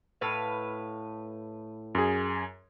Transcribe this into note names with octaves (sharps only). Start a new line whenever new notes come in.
A2 B4 F5
F#2 G#4